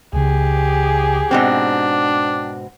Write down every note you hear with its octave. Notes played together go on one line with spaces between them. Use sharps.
C#2 C#3 G4 G#4
G#2 B2 C4 D4 G5